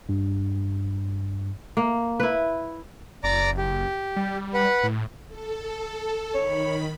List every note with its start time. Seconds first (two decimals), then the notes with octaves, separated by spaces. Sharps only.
0.09 G2
1.77 A#3
2.20 E4 B4
3.24 F#1 D5 A#5 D6
3.58 G4
4.17 G3
4.54 B4 F#5
4.83 A2
5.28 A4
6.35 D#3 C#5 B5